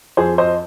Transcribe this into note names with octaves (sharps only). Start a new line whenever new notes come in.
F2 G#4 C5
C5 D#5